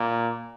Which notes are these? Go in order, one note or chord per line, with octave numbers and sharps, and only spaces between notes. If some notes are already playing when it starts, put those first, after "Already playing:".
Already playing: A#2